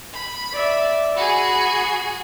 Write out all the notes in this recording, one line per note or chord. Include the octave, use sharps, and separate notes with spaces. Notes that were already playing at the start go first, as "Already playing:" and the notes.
B5
D5 E5
F#4 G#4 B5